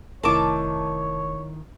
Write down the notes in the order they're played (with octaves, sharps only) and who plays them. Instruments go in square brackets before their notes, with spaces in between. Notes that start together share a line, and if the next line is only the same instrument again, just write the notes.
[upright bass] F1 [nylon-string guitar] D#3 E4 A#4 [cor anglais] C#5 [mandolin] A5 D6